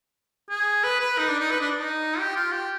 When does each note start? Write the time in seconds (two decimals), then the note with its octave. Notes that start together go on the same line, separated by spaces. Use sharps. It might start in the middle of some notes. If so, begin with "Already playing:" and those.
0.49 G#4
0.84 B4
1.00 B4
1.18 D#4
1.29 D4
1.39 D#4
1.51 B4
1.60 D4
1.77 D#4
2.19 G4
2.36 F4
2.52 G4